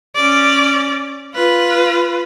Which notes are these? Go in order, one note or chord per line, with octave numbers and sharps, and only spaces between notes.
C#4 D5
F4 B4